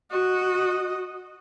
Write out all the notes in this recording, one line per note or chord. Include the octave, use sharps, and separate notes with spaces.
F#4 D#5